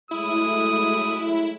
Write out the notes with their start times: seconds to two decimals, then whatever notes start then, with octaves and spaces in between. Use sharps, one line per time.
0.11 F#3 G#3 A3 E4 D#6